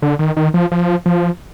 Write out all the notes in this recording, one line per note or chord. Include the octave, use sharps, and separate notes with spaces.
D3
D#3
D#3
F3
F3
F3